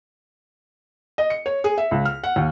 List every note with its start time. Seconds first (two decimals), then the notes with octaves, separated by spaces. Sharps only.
1.18 D#5
1.30 C#7
1.46 C#5
1.64 G#4
1.78 E5
1.91 C#2
2.05 F6
2.24 F#5
2.36 D#2